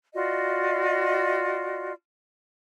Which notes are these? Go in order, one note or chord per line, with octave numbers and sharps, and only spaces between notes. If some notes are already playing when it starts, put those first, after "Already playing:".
F4 F#4 D5 D#5